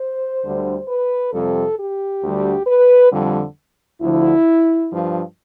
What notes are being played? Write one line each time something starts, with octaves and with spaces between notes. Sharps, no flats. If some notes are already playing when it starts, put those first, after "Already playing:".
Already playing: C5
D2 D3 G3
B4
F2 C3 G3 A4
G4
D2 D3 G3
B4
F2 D3 G3
D2 D3 F3 E4
G2 F3